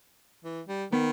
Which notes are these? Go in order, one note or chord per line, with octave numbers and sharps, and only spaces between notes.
E3
G3
D#3 B3